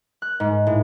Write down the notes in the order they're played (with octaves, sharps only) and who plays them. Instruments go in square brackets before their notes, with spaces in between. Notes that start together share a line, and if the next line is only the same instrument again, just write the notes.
[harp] F#6
G#2
A2